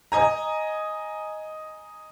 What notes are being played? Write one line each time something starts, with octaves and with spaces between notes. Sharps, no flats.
D#5 G#5 A#5